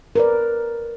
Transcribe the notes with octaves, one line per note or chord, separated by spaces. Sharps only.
A#4 B4 D5